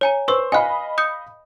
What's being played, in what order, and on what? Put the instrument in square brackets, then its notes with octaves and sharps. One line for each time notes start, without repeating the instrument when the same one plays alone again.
[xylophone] C#5 G#5 A#5
[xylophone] B4 C#6 E6 [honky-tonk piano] C5
[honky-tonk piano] D#5 F5 B5 [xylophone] G#5 F#6
[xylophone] D#6 G6 C#7